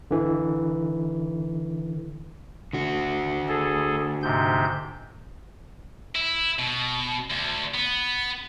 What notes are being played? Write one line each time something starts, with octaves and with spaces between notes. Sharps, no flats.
D3 E3
D3 F#4
G#4 A4
G#2 C3 G6
E4
B2
D2
B3